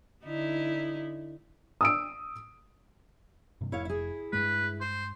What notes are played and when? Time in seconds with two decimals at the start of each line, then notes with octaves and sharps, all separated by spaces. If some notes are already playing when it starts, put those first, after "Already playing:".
0.24 D3 D#4 E4
1.81 D#6 E6 D7
3.61 G2 C3
3.72 F1 E4 C#5 F5
3.85 E4 G#4
4.33 G2 G#3 B4
4.81 C5